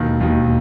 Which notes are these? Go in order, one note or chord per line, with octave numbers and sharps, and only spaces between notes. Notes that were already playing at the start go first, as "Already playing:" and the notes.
Already playing: E1 D#2 D#3
E1 D#2 D#3